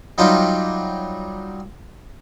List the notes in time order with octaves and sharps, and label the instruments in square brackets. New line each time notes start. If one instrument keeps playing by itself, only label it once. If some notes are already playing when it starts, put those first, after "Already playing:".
[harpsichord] F#3 G3 D#4 F4 G4